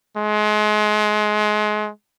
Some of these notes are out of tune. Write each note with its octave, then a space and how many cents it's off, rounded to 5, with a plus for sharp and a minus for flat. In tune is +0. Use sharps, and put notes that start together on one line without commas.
G#3 +30